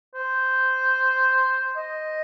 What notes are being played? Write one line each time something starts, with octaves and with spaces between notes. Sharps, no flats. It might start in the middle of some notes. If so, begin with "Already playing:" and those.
C5
D#5